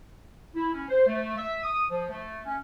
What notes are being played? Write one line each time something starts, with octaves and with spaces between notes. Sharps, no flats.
E4
C#4
C5
A3
E5
D#6
F3
A3
C#4